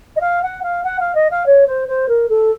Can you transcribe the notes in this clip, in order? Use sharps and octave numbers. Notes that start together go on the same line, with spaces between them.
D#5
F5
F#5
F5
F#5
F5
D#5
F5
C#5
C5
C5
A#4
A4